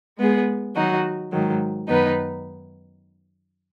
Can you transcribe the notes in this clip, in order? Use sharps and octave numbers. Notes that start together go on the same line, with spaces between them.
G#3 B3 G#4
D#3 F#3 D#4 F#4
G#2 D#3 F#3
F#2 D#3 B3 D#4 B4